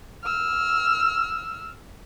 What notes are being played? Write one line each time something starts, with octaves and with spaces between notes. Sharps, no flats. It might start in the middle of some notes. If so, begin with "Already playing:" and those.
E6 F6